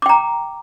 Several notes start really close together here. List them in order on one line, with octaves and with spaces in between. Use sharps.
D6 G5 A#5